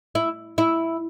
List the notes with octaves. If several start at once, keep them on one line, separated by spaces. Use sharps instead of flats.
E4
E4